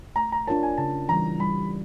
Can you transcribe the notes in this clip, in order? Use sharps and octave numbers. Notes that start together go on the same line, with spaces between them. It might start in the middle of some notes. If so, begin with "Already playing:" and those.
A3 A#5
A#5
D4 F4 A#4 C#5 A5
G#5
C#3 A5
E3 G3 A#5
G3 B5